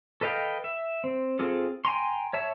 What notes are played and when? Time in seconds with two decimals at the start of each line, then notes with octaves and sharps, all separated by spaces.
0.21 A4 B4 D#5 F5 G5
0.64 E5
1.04 C4
1.39 C4 F4 G#4 A4
1.85 G5 G#5 A#5 C6
2.33 C#5 E5 A5